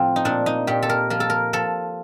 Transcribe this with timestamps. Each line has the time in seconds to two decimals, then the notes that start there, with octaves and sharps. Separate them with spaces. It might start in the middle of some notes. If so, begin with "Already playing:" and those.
Already playing: A2 F3 C4
0.16 D#4
0.25 A#2 D4
0.46 D#4
0.67 A#2 G4
0.83 A4
0.89 A#4
1.10 F3 A#4
1.20 A4
1.30 A#4
1.53 F3 A4